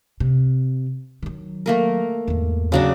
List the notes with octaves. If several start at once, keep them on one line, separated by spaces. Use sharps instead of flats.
C3
D#3 F#3
A3 A#3 A#4
E2 G#2
C#3 F#3 D4